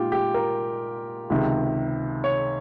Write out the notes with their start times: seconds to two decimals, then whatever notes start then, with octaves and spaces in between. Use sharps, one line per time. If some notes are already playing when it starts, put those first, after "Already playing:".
Already playing: A#2 G#3 D#4 F4 G4
0.12 G4
0.34 A#4
1.30 C#2 C3 D#3
2.24 C#5